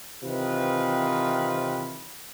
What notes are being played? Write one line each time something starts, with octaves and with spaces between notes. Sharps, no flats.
C3 D#3 E3 C4 F4 B4